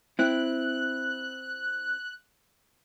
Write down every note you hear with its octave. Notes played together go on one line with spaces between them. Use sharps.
C4 E4 F#6